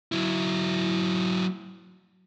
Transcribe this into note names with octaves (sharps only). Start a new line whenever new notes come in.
F#3 E4